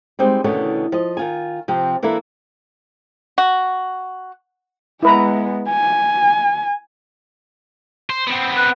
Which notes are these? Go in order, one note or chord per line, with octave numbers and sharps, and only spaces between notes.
G3 G#3 C4 D#4
E2 B2 D3 D#3 A3 C#4
F3 D#5
D#3 F4 G#5
C3 F3 C4
E3 A#3 D4 E4 A4
F#4
G#3 B3 E4 B4 A#5
G#5
C5
B3 C4
B4